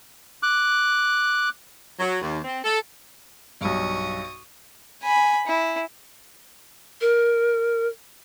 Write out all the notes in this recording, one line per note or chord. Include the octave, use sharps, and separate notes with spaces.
D6 F#6
F#3
D#2
C4
A4
B1 G2 C#6 D#6
G#5 B5
E4
A#4